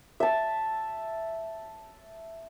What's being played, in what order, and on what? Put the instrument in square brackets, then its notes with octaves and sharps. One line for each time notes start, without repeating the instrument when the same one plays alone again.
[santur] E5 A5